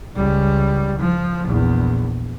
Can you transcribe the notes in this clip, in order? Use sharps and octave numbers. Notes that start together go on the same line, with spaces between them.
C#2 G3
F3
A#1 E2